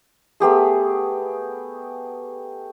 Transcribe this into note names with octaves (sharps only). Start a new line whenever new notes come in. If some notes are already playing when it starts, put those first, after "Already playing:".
A3 B3 G4 G#4